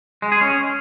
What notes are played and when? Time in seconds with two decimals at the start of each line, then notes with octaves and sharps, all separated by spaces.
0.22 G#3
0.32 G#4
0.41 C#4